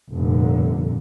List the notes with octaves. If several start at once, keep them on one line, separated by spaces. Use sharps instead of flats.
F1 G2 A#2 D3